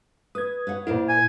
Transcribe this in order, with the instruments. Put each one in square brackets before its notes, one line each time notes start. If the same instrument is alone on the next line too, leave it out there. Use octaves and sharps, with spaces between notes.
[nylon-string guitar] B4 [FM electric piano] D#6 G#6
[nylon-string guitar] B4 C#5 F#5
[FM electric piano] A#2 E4 [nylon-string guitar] A#4 C5 D5
[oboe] G#5